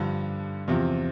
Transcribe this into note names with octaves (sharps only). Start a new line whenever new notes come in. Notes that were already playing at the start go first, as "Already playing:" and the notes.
Already playing: G2 D3 F3
E2 C3 F3